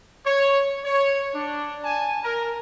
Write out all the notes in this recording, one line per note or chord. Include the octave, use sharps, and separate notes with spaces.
C#5
C#5
D4
G#5 A5
A#4